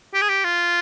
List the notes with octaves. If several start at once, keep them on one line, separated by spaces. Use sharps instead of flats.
G4
G#4
G4
F4